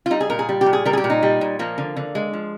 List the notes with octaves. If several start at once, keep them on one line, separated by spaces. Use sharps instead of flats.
F4
G3 D#4
G#4
A#2 A#4
G#4
G3
G4
A#2
G#4
G3 A#4
G#4
G4
A#2
D#4
G3
A#2
F3 A#3
D3
D3
G#3
F3